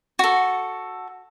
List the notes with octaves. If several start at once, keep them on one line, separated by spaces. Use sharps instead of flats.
F#4 A4